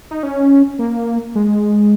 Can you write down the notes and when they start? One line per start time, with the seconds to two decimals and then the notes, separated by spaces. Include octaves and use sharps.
0.11 D#4
0.23 C#4
0.79 A#3
1.35 G#3